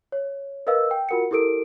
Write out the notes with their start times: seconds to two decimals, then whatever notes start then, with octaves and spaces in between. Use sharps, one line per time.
0.12 C#5
0.67 A#4 B4 D#5 F5 E6
0.91 G5
1.09 F4 F#4 A#4 F#5 C#7
1.31 E4 G4 A4 A#4 D7